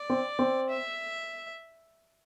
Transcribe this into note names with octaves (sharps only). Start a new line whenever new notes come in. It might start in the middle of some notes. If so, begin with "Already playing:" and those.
Already playing: D5
C4
C4
E5